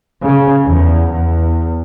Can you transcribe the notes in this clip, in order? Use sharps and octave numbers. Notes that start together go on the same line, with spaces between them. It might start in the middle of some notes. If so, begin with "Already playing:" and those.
C#3
E2
E2